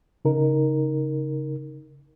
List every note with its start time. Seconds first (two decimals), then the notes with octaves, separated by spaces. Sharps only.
0.25 C#3 D#4 A#4